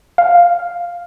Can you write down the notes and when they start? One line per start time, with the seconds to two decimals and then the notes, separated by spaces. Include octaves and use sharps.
0.18 F5